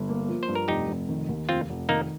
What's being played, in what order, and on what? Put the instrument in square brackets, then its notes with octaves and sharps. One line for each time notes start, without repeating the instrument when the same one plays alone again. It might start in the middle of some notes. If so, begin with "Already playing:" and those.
Already playing: [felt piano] G1
A#3
F3
[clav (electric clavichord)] C5
[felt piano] G2
[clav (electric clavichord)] A#4
[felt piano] F1 [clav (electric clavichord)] D#4 G4
[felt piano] F1
D#3
D#2
[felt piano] F1 [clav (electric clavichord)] C4 F4
[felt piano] F1
[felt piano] D#3 [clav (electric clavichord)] A#3 D#4